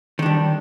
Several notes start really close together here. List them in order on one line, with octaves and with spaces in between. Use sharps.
D#3 D4 G3